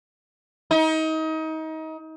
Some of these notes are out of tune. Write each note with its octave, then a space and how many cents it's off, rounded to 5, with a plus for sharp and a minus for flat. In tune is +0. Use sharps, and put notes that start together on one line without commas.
D#4 +30